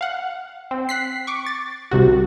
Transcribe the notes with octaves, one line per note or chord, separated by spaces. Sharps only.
F5 F#5
C4
F#6 B6 C7
C#6 D6
A6
C2 C3 F#4